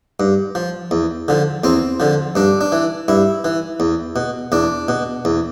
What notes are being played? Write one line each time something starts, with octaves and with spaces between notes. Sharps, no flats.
G2
F3
E2
D3 F3
E2 C4
D3 F3
G2 D4
D4
E3
G2 E4
E3
E2
B2
E2 D4
B2
E2